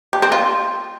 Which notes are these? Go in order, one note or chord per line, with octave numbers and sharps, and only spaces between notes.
G4
C4
F4